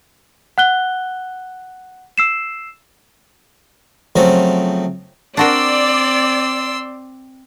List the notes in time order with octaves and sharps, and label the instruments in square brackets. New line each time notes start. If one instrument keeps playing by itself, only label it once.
[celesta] F#5 F#6 G7
E6 C7 E7
[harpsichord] C#3 F3 F#3 A3 C4 F#4
[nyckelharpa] C4 [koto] D4 F#4 A#4 [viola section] D5 [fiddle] C6 E6